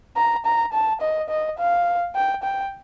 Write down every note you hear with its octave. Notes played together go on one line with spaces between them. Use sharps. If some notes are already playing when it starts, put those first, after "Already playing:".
A#5
A#5
A5
D#5
D#5
F5
G5
G5